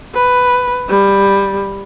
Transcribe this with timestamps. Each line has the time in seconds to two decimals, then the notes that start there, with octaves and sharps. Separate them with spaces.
0.14 B4
0.89 G3